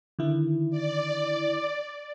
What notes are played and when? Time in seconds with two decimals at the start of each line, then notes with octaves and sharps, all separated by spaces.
0.19 D3 D#3 E4
0.70 D5